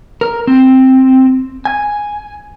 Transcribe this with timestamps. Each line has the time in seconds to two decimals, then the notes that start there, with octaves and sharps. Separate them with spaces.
0.21 A#4
0.47 C4
1.65 G#5